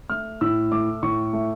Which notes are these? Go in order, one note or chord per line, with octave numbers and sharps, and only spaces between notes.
A3 F6
A2 E6
A3 D6
A2 C#6
A3